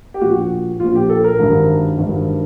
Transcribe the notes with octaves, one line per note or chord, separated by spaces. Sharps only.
G4
A#1 A#2 F#4
A#1 A#2 F4
G4
A4
A#4
G#1 G2 D#3
G#1 G2 D#3